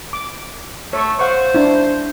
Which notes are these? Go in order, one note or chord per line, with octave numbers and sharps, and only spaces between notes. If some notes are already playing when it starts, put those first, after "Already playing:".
D6
A3 C#5 C#6
C5 F5 F#5 C#6
D4 E4